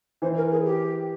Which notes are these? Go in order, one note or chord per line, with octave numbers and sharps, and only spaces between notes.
E3 C5
A#4
G#4
G4